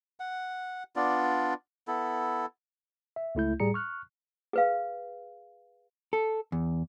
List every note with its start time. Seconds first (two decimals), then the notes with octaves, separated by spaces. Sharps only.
0.20 F#5
0.96 B3 D4 F4 D5
1.88 B3 E4 A4
3.16 E5
3.35 C#2 A3 E4 G6
3.60 A2 G3 G#4 A#5 C#7
3.74 C#6 F6 F#6
4.53 G#4 B4 F5
6.13 A4
6.52 E2